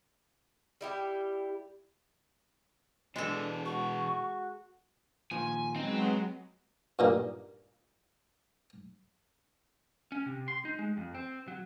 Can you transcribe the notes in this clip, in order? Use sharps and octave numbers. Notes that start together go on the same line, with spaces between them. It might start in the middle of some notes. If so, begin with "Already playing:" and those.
G3 E4 G4
B2 E3 G#3 D4 A4
F#4 C#6
A#2 D#3 F3 G#5
F#3 G#3 B3 C4 D#4
G2 A#2 D#4
C#4
C3
C6
D#4
G#3
F2
C4
F#3